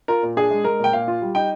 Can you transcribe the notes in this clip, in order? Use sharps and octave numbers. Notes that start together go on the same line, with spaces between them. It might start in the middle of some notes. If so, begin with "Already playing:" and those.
F4 A#4
A#2
D4 G#4
G#3
G#3 A#4
A#2 G5
A#2 F5
F4
G3
D#4 G5